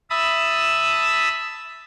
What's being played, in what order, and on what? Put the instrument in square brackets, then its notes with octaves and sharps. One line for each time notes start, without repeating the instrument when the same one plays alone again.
[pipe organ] E5 A5 B5 D#6 E6